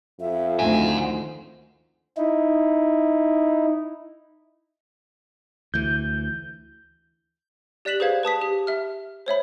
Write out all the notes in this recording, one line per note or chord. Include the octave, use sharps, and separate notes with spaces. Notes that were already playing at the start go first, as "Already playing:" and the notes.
F2 E5
D2 D#3 C5 F#5 G#5
D#4 E4
D2 E3 G6
G4 D5 F#6 B6 E7 F#7
G#4 B4 C5 F5 G#6
B4 A5 D#6 B6
G4
E5 F6
C5 C#5 E5 B5